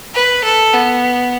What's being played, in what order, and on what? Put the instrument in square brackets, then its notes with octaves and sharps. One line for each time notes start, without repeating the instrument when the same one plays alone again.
[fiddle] B4
A4
B3